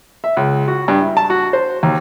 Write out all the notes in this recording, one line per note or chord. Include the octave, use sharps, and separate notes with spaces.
E5
C#2
F#4
G2
E4
A5
F#4
C5
D#2